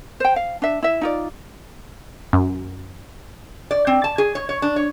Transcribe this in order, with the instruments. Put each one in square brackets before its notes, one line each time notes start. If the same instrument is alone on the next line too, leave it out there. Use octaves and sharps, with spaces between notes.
[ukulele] C5 G5
F5
D4 E5
E4 E5
D#4 F4 D5
[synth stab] F#2
[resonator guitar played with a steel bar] D5
C4
A5
G#4
C#5
C#5
D4
C#5